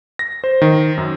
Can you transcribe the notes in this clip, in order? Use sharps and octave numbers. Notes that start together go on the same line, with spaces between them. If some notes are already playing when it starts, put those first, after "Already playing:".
A#6
C5
D#3
F#2